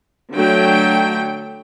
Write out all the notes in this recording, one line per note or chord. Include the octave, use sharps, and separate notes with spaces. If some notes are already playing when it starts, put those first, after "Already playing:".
D3 F#3 A3 G5